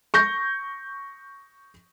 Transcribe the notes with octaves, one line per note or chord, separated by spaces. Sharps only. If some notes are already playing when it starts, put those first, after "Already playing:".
C#6 G6 A#6